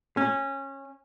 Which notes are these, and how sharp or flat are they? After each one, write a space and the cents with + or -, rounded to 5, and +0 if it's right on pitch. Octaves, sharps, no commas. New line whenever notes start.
C#4 -20